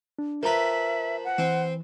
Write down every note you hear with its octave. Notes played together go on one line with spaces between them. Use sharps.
D4
F3 A#4 B4 E5 A#5
F#5
E3 C4